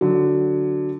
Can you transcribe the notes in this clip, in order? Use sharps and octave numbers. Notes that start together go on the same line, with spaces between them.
D3 F#3